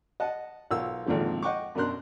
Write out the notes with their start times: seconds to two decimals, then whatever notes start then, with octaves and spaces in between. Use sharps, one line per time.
0.20 D#5 F#5 A5
0.71 B1 F4 A#4 E6
1.06 G#1 F2 A#2 D3 F3
1.42 D#5 F#5 G5 C#6 D6
1.75 F#2 B2 D4 A#4 C6 F#6